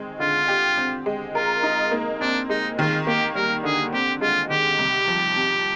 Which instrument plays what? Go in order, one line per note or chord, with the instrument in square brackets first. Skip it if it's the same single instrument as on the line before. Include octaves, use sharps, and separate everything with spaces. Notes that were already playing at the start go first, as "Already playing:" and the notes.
Already playing: [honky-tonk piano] D#3 G#3 C4
[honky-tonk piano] D3 [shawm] F4
[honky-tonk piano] G4
C4
G#3
[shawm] F4 [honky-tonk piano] A#4
[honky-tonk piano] D#4
A#3
[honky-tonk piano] C4 [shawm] D4
[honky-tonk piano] G#3 [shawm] D#4
[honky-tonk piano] D#3 [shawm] F4
[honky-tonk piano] A#3 [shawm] G4
[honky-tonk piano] G3 [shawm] A#4
[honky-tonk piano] D3 [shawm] G#4
[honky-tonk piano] C4 [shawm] G4
[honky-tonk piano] G#3 [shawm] F4
[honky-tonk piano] D#3 [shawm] G4
[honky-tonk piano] C2
F3
C3